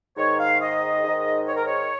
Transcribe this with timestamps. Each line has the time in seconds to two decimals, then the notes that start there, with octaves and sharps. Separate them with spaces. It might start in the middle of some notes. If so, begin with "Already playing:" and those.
0.17 G#2 D#3 C#5
0.39 F5
0.60 D#5
1.03 G#2 D#3
1.48 C#5
1.56 A#4
1.66 C#5